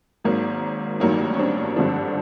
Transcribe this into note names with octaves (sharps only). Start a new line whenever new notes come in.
G#1 G#2 D#3 F#3 A#3
A1 G2 D#3 F#3 A#3
C#4
C4 D4
G#1 G2 D3 F3 C4 D4